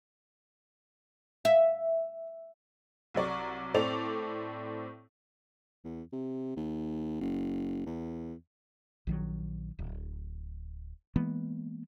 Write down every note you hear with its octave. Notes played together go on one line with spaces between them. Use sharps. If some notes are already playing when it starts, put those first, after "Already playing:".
E5
C2 F#3 D5 C#6
A2 C4 A4 D5 D6 F7
E2
C3
D#2
F#1
E2
A#1 D#3 F#3
D1
E3 G#3 A#3 B3